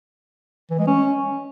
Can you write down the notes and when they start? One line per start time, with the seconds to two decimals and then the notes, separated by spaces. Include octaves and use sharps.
0.70 E3
0.79 G#3
0.87 C#4